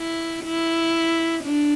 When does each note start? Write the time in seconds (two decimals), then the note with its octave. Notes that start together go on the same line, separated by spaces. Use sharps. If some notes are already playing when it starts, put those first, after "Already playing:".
Already playing: E4
0.45 E4
1.44 D4